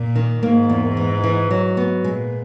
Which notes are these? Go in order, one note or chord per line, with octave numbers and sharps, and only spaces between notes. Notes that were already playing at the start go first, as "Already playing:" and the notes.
Already playing: A#2
D#3
G#2 A#3
E2
E3
E3
F#3
B3
A#2 G#3